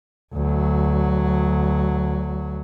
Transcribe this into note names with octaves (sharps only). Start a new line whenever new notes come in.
D2 F#3